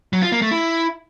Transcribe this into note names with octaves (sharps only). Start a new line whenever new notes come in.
F#3
F4
A#3
A3
E4